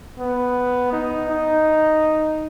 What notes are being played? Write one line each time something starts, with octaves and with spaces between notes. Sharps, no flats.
B3
D#4
D#4